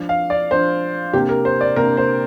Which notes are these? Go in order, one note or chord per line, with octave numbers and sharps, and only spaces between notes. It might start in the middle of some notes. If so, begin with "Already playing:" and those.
Already playing: F3 D4
F5
D5
F3 D4 C5
C3 A#3 D4 G4
A#4
C5
D5
C3 A#3 D4 A#4
C5